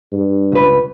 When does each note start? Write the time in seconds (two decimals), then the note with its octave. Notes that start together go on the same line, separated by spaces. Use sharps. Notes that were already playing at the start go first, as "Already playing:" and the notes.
0.12 G2
0.52 C#2 B4